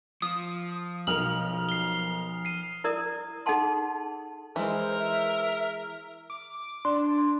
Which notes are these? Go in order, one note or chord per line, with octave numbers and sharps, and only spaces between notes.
F3 D#6
B1 A#4 D#6 F6 F7 F#7
C7 G7
C7 D#7
E4 A#4 D5 D#6
D#4 G#4 A4 F#5 A5 C6
E3 G#3 A#4 C5
E5
D6
D4 C6